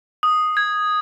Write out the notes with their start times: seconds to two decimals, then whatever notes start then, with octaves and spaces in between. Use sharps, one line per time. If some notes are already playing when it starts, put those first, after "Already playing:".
0.23 D#6
0.57 G#6